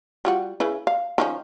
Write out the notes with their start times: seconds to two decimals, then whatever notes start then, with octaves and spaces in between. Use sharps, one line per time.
0.25 G3 F4 F#4
0.60 C#3 E4 B4
0.87 F5
1.18 D#3 F3 C#4